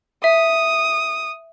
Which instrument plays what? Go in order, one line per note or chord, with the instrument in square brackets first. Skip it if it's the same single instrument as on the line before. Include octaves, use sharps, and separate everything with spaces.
[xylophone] E5 [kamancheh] D#6